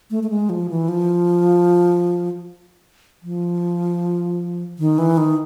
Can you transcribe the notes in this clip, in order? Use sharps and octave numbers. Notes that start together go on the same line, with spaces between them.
A3
A3
G#3
F3
E3
F3
F3
D#3
E3
D#3